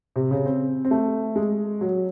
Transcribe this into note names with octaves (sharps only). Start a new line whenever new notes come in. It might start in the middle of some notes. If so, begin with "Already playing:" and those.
C3
C#3
C4
C4
A3
G#3
F#3